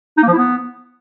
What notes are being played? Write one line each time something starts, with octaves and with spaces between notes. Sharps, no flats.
D#4
A#3
F3
E4
B3